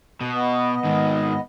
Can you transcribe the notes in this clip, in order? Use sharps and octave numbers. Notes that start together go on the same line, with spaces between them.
B2
B3 D#5
G#2 D#3